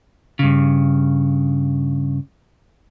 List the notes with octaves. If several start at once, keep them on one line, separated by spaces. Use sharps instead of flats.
G2 C#3